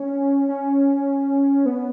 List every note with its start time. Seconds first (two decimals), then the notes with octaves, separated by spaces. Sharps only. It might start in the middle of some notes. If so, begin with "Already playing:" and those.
Already playing: C#4
0.49 C#4
1.66 B3